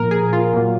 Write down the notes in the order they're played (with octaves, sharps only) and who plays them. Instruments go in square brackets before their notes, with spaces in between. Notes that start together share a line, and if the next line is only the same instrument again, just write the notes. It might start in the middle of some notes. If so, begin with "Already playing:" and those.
Already playing: [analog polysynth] A#2 F3 A#3 A#4
G#4
F4
A#2 F#3 A#3